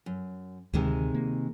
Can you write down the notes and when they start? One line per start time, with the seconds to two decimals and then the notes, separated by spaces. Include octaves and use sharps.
0.06 F#2
0.74 D2 C3 D#3 G#3
1.15 A#3